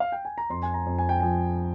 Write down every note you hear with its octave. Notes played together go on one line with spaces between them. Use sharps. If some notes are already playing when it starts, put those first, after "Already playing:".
F5
G5
G#5
A#5
F2 C6
G#5
A#5
F2
G#5
G5
F3 G#5